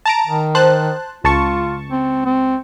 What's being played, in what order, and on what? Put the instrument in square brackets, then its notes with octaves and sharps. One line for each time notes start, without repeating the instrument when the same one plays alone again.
[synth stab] A5 A#5 D7
[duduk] D#3
[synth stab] C5 A5 F#6
[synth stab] C#2 A5 C#6 [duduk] F4
[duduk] C4
C4